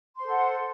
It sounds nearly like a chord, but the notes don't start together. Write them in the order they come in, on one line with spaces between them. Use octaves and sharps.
C6 C5 A4 F#5